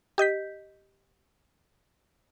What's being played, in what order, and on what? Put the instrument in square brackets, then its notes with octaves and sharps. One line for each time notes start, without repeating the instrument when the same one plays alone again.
[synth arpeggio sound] G4 D#5 G6 B6